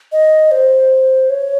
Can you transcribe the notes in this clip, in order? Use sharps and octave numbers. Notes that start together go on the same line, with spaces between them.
D#5
C5
C#5